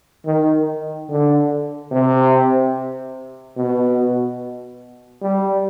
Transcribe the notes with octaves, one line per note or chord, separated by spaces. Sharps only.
D#3
D3
C3
B2
G3